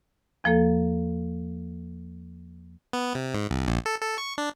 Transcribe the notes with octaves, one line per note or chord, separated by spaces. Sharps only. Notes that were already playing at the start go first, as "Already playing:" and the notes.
E2 F3 A#3 A4
B3
C3
G#2
C2
A#1
A4
A4
C#6
D4